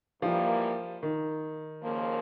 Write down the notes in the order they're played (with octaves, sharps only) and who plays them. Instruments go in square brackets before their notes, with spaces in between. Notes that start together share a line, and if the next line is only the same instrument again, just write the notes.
[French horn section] G#2 E3 G3 A#3 [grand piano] F3
[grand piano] D#3
[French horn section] D#2 C#3 F3 A#3